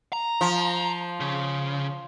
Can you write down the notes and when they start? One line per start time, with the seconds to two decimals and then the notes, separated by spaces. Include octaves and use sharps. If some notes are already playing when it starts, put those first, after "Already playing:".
0.13 A#5
0.41 F3
1.20 C#3